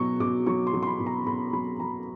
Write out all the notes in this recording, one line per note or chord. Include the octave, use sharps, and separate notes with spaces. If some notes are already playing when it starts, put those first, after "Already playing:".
Already playing: B2 F#3 C#6
B2 D6
F#3 C#6
C6
F#3
C6
B5
B2
A#5
B2 B5
F#3 B5
F#3 A#5